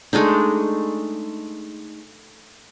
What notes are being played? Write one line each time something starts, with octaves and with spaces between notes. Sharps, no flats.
G#3 A3 D4 D#4